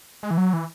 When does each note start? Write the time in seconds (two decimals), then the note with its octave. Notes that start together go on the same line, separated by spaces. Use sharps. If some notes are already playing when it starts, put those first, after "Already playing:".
0.23 G#3
0.31 E3
0.38 F#3
0.53 E3